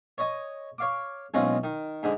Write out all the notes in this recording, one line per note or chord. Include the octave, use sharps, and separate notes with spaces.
C#5 D#5 G#5
C#5 F5 D6
B1 G#3 C4 C#4 F4 D#5
D#3
G#2 D3 G#3